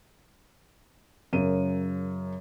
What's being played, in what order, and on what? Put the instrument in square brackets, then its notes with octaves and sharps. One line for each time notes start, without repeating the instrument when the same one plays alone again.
[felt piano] F#2 C#3 A#4 D#7